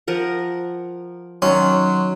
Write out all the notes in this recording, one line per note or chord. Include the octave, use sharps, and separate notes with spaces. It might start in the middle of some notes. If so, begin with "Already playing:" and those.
F3 A#4 F#5
D#3 F#3 C#4 C6